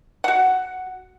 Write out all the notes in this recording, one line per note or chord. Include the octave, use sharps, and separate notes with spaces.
F#4 F#5